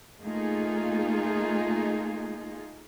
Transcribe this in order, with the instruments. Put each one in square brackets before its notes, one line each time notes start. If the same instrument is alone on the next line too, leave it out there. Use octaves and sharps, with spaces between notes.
[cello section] A3 A#3 D#4 F4 G#4